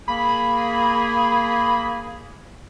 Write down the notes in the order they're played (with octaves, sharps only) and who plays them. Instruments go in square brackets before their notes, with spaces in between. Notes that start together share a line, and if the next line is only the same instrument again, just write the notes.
[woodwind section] A#3 G#4 [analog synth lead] B5